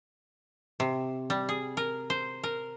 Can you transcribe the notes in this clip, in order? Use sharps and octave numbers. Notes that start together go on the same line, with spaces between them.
C3
G3
G#4
A#4
C5
A#4